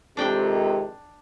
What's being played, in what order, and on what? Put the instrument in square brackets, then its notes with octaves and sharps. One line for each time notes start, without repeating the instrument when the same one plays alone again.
[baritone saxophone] F2 [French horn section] C3 D#3 G#3 [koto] D4 G5